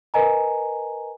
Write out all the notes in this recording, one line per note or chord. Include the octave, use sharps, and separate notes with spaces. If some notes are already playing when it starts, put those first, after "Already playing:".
A#4 B4 D#5 G#5 A#5